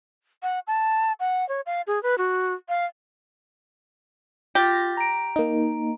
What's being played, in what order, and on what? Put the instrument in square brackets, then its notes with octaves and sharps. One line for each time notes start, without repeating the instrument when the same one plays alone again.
[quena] F#5
A5
F#5
C#5
F5
G#4
B4
F#4
F5
[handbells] F4 F6 A6 [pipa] G4 [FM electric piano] A#6
[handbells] A#5 D7
[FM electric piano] A#3 D#4